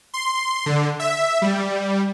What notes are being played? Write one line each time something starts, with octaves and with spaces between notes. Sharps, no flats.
C6
D3
E5
G3